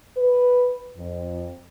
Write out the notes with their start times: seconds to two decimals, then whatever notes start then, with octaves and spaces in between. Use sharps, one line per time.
0.17 B4
0.97 F2